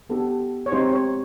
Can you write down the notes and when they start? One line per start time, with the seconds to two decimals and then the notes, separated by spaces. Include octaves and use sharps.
0.10 B3 D4 G4 A4
0.66 C#5
0.72 G#3 C4 D#4 G4 C5
0.93 C#5